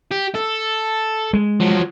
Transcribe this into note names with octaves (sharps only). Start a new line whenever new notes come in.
G4
A4
G#3
F3 F#3